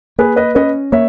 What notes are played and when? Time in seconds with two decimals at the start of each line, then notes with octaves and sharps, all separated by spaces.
0.18 A#3 G#4 B4
0.36 B4 D#5
0.55 C#4 B4 D#5
0.92 A#3 C#5 E5